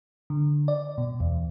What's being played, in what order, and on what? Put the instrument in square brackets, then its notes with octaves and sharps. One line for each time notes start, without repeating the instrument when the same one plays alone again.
[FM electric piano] D3
D5
B2
E2